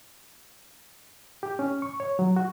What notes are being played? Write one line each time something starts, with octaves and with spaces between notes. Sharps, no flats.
G4
C#4
C#6
C#5
F#3
F#4